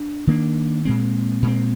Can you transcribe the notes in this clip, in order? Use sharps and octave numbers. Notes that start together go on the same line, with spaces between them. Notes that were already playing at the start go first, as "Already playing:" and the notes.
Already playing: D4
D#3 A#3 D4
A#2 G#3 C4
A#2 G#3 C4